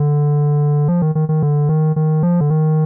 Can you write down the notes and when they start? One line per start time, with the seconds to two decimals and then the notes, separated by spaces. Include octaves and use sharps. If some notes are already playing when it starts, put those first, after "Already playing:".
Already playing: D3
0.88 F3
1.02 D#3
1.15 D#3
1.29 D#3
1.43 D3
1.69 D#3
1.96 D#3
2.23 F3
2.40 D3
2.50 D#3